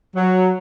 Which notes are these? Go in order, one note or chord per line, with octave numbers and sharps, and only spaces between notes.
F#3